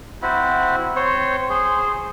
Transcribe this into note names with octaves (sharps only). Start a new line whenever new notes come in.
C4 E4 F#4
C4 C5 C#5
G#4 C5